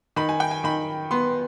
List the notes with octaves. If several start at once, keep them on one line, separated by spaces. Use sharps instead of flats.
D#3 B5
G#5
G5
G#5
D#3 B5
B3 C6